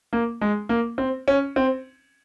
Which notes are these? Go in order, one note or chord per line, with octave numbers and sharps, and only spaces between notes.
A#3
G#3
A#3
C4
C#4
C4